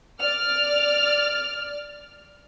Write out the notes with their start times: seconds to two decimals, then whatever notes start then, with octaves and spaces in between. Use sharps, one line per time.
0.20 D5 F6